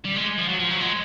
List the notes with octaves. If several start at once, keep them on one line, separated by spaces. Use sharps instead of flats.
G3
G#3
F3
F#3
F3
F#3
G#3